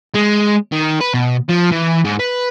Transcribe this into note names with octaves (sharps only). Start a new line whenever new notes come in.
G#3
D#3
B4
B2
F3
E3
G#2
B4